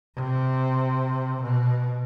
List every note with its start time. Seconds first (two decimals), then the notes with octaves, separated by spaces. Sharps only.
0.15 C3
1.42 B2